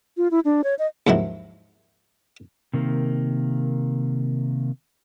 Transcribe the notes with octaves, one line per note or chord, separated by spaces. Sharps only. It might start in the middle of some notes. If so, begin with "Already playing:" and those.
F4
E4
D4
C#5
D#5
D#2 G#2 F3 F#3 E4
C3 D#3 A#3